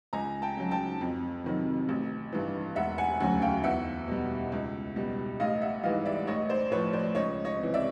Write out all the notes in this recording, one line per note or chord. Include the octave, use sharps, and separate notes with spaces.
C#2 G#5 A#5
G5 A5
C#3 F#3
G5 A5
F2
C3 D#3 F#3
A1
G2 E3
E1 E5 F#5
F#5 G#5
D2 C#3 F#3 F#5 G#5
F5 G5
E2 E5 F#5
B2 G3
C#2
B2 G3
A1 D#5 F5
E5 F#5
G#2 E3 G3 D#5 F5
D5 E5
A1 C#5 D#5
C5 D5
A2 F3 B4 C#5
C5 D5
C#2 C#5 D#5
C#5 D#5
C3 E3
D5 E5